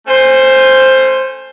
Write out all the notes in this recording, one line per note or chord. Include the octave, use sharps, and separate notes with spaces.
A3 C#4 C5